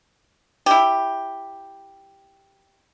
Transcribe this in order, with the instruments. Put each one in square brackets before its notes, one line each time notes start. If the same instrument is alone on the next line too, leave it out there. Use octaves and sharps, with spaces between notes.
[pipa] E4 G4